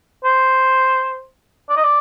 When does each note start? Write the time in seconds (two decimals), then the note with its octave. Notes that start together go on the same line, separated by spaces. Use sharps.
0.25 C5
1.70 D5
1.77 D#5
1.84 D5